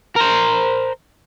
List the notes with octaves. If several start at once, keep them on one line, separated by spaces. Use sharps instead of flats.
A#4 C5